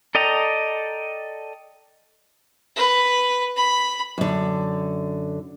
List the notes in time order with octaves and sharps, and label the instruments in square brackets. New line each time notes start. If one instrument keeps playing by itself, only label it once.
[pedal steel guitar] A4 D5 D#5 G5 A#5
[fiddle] B4
B5
[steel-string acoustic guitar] F#2 D3